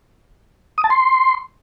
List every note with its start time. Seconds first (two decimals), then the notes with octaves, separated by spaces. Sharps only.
0.78 D#6
0.84 A5
0.90 C6